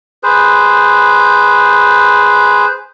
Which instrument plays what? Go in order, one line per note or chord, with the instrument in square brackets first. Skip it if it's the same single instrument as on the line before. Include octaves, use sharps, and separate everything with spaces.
[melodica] G#4 B4 C5